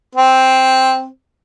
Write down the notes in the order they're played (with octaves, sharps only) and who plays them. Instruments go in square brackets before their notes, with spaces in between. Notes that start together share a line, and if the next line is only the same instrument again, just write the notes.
[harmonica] C4